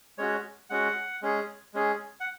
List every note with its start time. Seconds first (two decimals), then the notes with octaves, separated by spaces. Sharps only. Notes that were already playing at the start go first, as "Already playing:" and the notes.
0.18 G#3 C#4 F#4 C#5
0.70 G#3 C#4 F#4 F#5
1.22 G#3 C#4 G#4
1.74 G#3 C#4 G#4
2.20 F#5